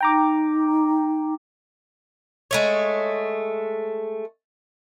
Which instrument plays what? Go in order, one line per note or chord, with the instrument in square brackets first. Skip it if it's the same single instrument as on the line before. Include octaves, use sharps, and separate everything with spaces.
[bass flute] D#4 [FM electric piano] G5 A#5 D6
[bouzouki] G#3 A3 C#5